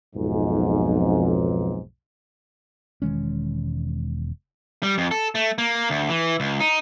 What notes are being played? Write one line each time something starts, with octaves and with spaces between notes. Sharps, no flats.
B1 F2 G#2
E1 D#3 G#3 C#4
G3
F2
A4
A3
A#3
D2
E3
C#2
D#4